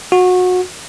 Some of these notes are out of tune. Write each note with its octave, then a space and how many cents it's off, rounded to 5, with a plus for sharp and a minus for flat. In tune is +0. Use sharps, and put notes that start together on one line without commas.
F#4 -25